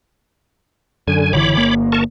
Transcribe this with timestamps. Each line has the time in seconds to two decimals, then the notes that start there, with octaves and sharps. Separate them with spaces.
1.08 F#2 D3 G#5
1.33 F#1 D3 E3 C#5 B5 D6
1.56 G1 A#3
1.92 A#4 A5 C#6